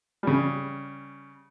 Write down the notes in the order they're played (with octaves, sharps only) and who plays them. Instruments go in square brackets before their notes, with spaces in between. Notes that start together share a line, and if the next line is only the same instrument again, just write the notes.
[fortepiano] C#3 G3